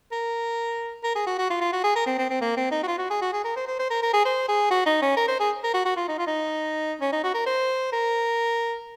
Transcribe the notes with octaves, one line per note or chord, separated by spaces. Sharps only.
A#4
A#4
G#4
F#4
F#4
F4
F4
F#4
G#4
A#4
C4
C4
C4
A#3
C4
D#4
F#4
F4
F#4
G#4
F#4
G#4
A#4
C5
C5
C5
A#4
A#4
G#4
C5
G#4
F#4
D#4
C#4
A#4
C5
G#4
A#4
F#4
F#4
F4
D#4
F4
D#4
C#4
D#4
F#4
A#4
C5
A#4